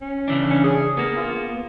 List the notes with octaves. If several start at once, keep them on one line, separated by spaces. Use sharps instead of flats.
C#4
C#3 E3 D4
C#4
G#4
A#3 B3 G#4
F4